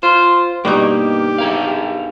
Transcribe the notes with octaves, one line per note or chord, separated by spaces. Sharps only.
F4 C5
G2 B2 A#3 D#4 G4
G#4 A#4 F5